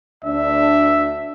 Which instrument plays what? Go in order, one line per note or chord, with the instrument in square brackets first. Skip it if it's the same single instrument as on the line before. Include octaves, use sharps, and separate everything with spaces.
[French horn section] D2 D4 [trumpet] E5